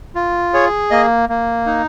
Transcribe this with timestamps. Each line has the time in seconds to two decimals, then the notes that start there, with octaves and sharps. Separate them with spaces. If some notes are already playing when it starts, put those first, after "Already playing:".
0.15 F4
0.54 G#4 C#5
0.91 A#3 D#5
1.29 A#3
1.66 D#4